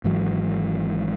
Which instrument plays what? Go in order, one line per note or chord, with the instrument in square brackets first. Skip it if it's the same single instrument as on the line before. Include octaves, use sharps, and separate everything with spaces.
[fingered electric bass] G#1 G#2 E3 F#3